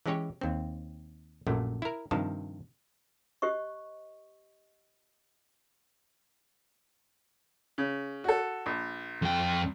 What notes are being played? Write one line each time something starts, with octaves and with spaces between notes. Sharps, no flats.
E3 G#3 C#4 G4 C#5
D#2 C4
A#1 F#2 A#2 A3
E4 A#4
G2 C3 D#3 F3 A5
G4 C5 D#5 C#6
C#3
F#4 A4
A#1
F2 G5